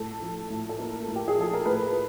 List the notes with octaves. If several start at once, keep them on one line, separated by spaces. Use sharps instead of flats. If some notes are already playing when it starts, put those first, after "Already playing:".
Already playing: A2 A4
F3
A2
A4
A#3 A#4
A2
G4
G#4
F3 A4
A#4
A2 B4